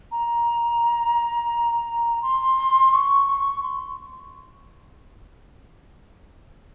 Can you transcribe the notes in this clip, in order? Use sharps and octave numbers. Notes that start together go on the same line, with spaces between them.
A#5
C6
C#6
C6